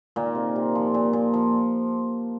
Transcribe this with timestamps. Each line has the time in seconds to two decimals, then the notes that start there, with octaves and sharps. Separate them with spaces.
0.16 A#2 D#3 A#3
0.35 C3
0.56 C3
0.75 F3
0.94 A#2
1.13 A#2
1.34 F3